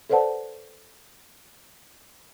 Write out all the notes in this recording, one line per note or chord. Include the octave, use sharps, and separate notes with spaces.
A4 B4 C5 D5 F#5 A5